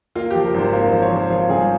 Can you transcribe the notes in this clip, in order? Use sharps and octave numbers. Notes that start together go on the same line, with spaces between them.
A#3 F4
G4
F3
A#4
G#1 C5
A#3 A#4
C5
F3
C#5
F3
C5
F3 F4
G2 G#4